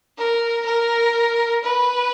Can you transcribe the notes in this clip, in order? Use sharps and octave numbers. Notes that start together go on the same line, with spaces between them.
A#4
A#4
B4